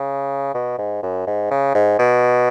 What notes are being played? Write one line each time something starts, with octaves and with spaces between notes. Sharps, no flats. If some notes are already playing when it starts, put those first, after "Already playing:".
Already playing: C#3
B2
G#2
F#2
G#2
C#3
G#2
B2